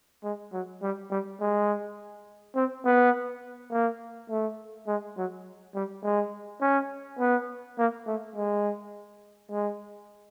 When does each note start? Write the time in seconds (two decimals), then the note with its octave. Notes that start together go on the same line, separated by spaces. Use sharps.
0.24 G#3
0.53 F#3
0.82 G3
1.11 G3
1.40 G#3
2.56 C4
2.85 B3
3.71 A#3
4.30 A3
4.87 G#3
5.17 F#3
5.75 G3
6.03 G#3
6.61 C#4
7.19 B3
7.78 A#3
8.07 A3
8.36 G#3
9.51 G#3